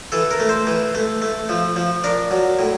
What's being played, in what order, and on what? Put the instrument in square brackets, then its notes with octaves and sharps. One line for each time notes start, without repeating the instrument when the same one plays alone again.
[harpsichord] E3 A4
A#4
A3
C5
E3
A3
A3
F3
F3
D4 A#4
F#3
A2